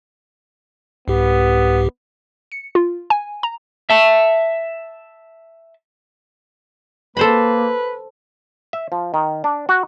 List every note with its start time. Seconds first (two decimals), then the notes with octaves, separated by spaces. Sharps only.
1.08 C2 G#2 B3 G4
2.52 C#7
2.75 F4
3.10 G#5
3.43 A#5
3.90 E5 A5
7.17 A#3 A4 B4 C5 B5
8.73 E5
8.92 F3
9.14 D#3
9.44 D4
9.69 F#4